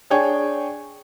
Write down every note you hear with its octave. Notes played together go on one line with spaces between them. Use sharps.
D4 G#4 C#5 G5 G#5